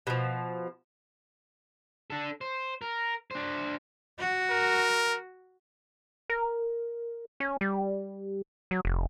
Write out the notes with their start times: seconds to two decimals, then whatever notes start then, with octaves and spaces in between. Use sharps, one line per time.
0.07 B2 F3
2.10 D4 A4
2.41 C5
2.82 A#4
3.31 D4 C5
4.19 F#4
4.51 A#4
6.30 A#4
7.40 C#4
7.61 G3
8.71 F#3
8.85 F1